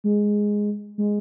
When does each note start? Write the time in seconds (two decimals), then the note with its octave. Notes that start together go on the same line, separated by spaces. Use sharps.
0.04 G#3
0.98 G#3